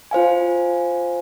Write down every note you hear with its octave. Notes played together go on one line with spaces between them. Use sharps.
F4 C5 F5 G#5